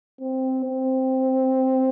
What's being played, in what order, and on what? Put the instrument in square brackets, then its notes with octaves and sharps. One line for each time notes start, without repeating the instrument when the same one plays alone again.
[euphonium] C4
C4